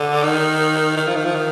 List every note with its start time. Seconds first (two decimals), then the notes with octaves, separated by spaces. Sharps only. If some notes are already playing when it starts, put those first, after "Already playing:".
Already playing: D3
0.23 D#3
0.97 D#3
1.07 F3
1.16 D#3
1.25 F3
1.35 D#3